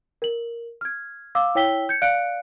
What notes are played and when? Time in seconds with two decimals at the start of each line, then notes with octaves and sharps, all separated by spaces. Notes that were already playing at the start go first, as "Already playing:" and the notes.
0.22 A#4 F#7
0.81 F6 G#6
1.35 F5 D6 E6
1.55 E4 C#5 G5 E6 B6 G7
1.89 G6 G#6 C#7
2.02 D5 F5 F#6 C#7 D7